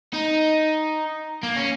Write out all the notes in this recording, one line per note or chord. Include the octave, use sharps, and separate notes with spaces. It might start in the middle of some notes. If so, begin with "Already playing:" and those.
D#4
A#3
C#4